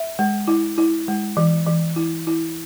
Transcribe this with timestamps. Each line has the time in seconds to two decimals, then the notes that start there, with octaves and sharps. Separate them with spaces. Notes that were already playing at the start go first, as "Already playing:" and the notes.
Already playing: E5
0.19 G#3
0.48 E4
0.78 E4
1.08 G#3
1.37 E3
1.67 E3
1.96 E4
2.27 E4